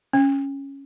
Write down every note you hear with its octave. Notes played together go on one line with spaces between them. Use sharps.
C#4